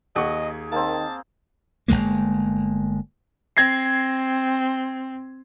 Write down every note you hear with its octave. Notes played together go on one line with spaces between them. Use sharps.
D#2 G#4 D#5 F#5 C#6
D#3 A#3 C4 A5
G1 G#2 G#3 A#3
C4 G#6 A#6 C7